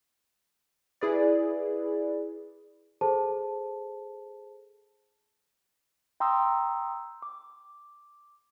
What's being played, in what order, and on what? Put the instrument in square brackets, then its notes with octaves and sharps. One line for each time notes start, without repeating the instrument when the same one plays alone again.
[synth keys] E4 G#4 B4 D5
[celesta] G#4 A4 C5 A5
[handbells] G5 A#5 C6 D#6 E6
D6